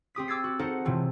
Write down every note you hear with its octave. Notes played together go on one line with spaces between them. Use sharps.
C4 G4 D#6 B6
D6 E6 G#6 A6 C7
F#4
D#4 A4 A#4 C5 F#5
A2 C3 E3 F4